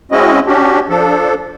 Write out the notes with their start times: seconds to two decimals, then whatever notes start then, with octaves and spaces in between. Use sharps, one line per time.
0.12 G#3 C4 C#4 E4 F#4 D#5
0.47 C#4 D4 F#4 G4
0.89 F3 D4 A4